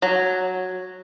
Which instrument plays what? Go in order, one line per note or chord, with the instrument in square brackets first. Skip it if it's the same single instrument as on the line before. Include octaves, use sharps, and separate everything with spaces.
[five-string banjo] F#3